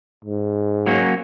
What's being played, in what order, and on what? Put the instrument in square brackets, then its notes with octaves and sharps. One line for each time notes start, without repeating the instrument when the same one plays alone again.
[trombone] G#2
[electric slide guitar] F#3 A#3 C#4